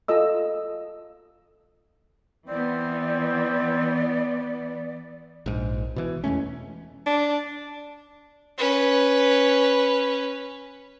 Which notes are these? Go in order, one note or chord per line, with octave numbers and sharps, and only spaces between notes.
F4 A4 D#5 E6
E3 B3 C4 D5
A#1 G#2
B2 E3
E2 G#3 A3 C#4
D4
C#4 B4